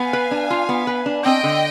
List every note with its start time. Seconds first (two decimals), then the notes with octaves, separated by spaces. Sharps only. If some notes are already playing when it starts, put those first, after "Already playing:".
Already playing: B3 F5 G#5
0.13 B4
0.31 D4
0.50 F4
0.69 B3
0.87 B4
1.06 D4
1.25 C4 D#5 G5
1.43 D3